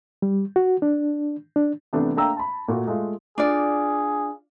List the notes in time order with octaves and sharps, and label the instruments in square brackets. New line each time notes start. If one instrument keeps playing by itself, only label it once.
[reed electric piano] G3
F#4
D4
D4
[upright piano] C3 E3 A3 B3 D4
A3 A#3 D4 G5 A#5 E6
A5 B5
A#2 A3 F#4
G#3 A3 F4
[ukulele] D4 F4 D5 [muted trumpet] G#4